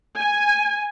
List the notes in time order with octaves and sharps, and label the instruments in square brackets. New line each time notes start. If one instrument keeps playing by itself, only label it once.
[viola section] G#5